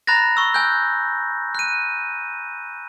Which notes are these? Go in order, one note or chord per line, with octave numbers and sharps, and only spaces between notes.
A#5 B5 F#6 A6 A#6
C#6 E6
G#5 E6 F#6 G6
F#6 D#7